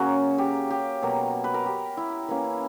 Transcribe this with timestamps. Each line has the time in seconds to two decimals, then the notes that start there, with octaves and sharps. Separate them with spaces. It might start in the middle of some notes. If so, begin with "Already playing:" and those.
Already playing: C#3 F#3 A#3 C#4 F#4
0.38 G4
0.70 G4
1.02 B2 F#3 A#3
1.44 B4
1.54 A#4
1.66 G4
1.97 E4
2.28 E3 A#3 C#4